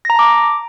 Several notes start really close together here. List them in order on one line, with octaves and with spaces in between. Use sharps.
A#6 A#5 A5 D6